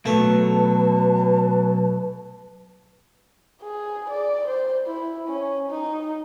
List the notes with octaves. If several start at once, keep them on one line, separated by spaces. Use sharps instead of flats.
B2 F#3 A3 B4 A5
G#4
D5
C5
E4
C#4
D#4